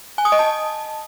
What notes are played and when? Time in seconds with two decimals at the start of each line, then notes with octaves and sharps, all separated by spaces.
0.18 G#5
0.25 D#6
0.32 D#5
0.39 A5